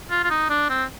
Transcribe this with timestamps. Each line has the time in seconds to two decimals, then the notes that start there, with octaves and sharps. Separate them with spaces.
0.11 F4
0.24 F4
0.30 D#4
0.50 D4
0.70 C4